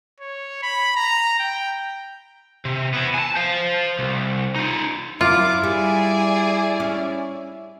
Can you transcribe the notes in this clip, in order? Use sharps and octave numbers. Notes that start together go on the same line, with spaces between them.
C#5
B5
A#5
G5
C3
B3 E4
G#5 A5
C5 F5
C2
D#4 F4
F#2 E4 F4 D6
G3 G#4 D5
C#4